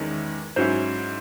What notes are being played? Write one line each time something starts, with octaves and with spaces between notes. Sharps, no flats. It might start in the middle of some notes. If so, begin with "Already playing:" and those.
Already playing: E2 D#3 G#3 C#4 E4
G#2 F#3 C#4 E4 C5